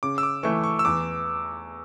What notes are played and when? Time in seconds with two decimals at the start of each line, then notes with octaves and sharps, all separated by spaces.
0.03 C#3 D6
0.18 E6
0.23 D6
0.43 E3 A3 C#6
0.64 C#6
0.79 E6
0.85 E2 D6